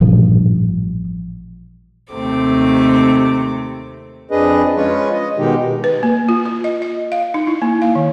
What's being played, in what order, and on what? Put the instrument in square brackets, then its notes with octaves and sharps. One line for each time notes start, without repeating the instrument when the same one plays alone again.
[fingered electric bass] A1 G2 A#2 F3
[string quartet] D#2 C3 A3 C4 D6
[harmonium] F2 D4 G#4 B4 D#5
G#3 C#4 F4 B4 C#5
D#5
B2 D#3 G#3 D#4 G4
[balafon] B4
A#3
F4
F4
D#5
D#5
F5
D#4
E4
A#3
F5
D#3